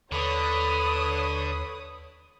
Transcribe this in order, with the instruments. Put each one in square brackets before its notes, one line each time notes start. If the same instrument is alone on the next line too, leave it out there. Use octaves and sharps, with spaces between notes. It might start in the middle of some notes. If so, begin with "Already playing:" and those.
[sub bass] D#2 [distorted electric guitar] D3 [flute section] A4 B4 B5 [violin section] C#5 D#6